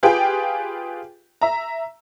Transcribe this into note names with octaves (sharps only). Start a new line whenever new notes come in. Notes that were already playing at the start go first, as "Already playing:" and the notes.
F4 G4 G#4 B4 G5
E5 A#5